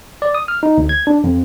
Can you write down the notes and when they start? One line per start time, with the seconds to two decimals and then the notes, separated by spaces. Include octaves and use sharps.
0.22 D5
0.35 D#6
0.48 F6
0.63 D#4
0.78 D2
0.89 G#6
1.07 D4
1.24 F2